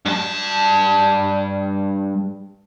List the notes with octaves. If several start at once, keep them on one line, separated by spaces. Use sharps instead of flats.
G2 A5